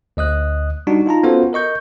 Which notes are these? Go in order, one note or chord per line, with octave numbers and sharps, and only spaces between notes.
D2 D#5 D#6 F#6
G3 D4 D#4 F#4
D#4 F4 A5 A#5
B3 C#4 F4 F#4 A4 C5
A#4 D#5 C#6 G6